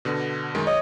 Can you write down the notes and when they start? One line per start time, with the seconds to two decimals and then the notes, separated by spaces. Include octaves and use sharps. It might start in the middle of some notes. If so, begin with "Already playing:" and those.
0.05 B2 D3
0.55 F#2 D#3 G#3
0.67 C#5 D#5